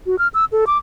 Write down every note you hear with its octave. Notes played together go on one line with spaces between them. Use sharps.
F#4
F6
E6
A4
D6